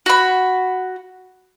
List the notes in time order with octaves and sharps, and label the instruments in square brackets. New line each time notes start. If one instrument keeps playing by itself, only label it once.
[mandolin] F#4 B5